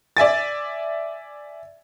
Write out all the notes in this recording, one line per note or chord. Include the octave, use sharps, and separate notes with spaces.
D5 E5 G#5 A6